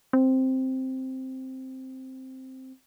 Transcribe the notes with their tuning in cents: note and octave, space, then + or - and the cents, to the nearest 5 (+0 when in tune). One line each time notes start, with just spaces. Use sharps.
C4 +0